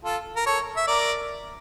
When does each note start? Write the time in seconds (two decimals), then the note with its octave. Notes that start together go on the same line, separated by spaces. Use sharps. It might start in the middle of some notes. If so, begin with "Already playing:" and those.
0.05 F4 A4
0.36 A#4
0.46 A4 C#5
0.77 E5
0.87 A#4 D5